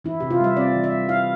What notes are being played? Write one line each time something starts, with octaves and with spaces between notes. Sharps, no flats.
E3 E4
C3 G4
F4
G3 E5
C4 D5
E3
E5
G3
E4 F5